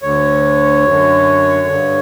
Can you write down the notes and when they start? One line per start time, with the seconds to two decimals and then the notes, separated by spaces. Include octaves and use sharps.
0.02 D2 D3 C#5
0.86 F#2 D3
1.68 G2 D3